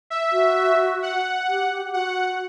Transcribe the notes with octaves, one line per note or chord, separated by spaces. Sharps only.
E5
F#4
F#5
G4
G4
G4
F#4 F#5